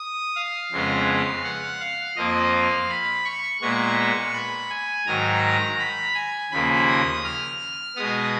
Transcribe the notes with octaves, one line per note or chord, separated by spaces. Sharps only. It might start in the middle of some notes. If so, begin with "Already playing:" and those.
Already playing: D#6
F5
F2 C#3 G#3 B3
F#5
F5
F2 F3 A#3 D#5
F5
B5
C#6
A#2 G#3 B3 C#6
B5
G#5
G#2 D#3 F#3 A#5
B5
G#5
D#2 C#3 F3 A#3 B5
D#6
F6
B2 G#3 B3 D#6